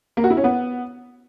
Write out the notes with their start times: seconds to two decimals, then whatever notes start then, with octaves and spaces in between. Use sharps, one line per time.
0.17 A#3
0.24 F#4
0.31 E4
0.37 C#4
0.44 B3